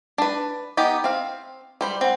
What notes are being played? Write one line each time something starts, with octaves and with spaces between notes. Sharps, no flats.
D4 B4
B3 D#4 G4
C4 F5
G3 C5 B5
C4 F#5